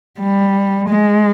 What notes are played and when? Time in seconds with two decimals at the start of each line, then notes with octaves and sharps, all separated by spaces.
0.20 G3
0.89 G#3